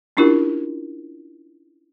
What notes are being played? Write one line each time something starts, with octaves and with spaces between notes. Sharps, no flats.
C#4 D4 E4 F4 G4 A#4